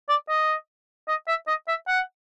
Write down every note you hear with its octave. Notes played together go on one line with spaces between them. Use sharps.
D5
D#5
D#5
E5
D#5
E5
F#5